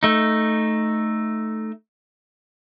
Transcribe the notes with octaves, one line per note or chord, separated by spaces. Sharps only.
A3 D#4